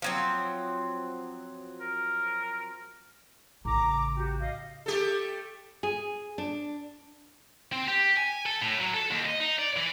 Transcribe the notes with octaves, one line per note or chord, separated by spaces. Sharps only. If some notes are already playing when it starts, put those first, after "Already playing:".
F3 F#3 C4
A#4
A1 C#3 A#5 D6
F#4 G4
D#5 F5
A3 G4 A4
G#4
D4
C4
G4
G#5
A4
A2
F#3
A4
D#2
D#5
D#4
D5
E3